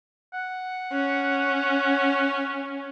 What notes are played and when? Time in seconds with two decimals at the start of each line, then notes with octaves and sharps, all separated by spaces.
0.33 F#5
0.92 C#4